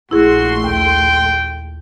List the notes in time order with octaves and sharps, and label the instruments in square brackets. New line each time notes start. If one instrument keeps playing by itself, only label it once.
[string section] A#1 A3 C6 [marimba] E4 G#4 [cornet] F#4
[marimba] D#2 [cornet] G5